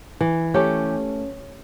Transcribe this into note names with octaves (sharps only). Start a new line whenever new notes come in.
E3
A3 C#4 G4